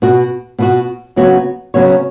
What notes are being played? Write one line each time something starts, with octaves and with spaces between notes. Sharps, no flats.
B2 B3 F#4
B2 B3 F#4
C#3 F#3 B3 F#4 C#5
C#3 F#3 B3 F#4 C#5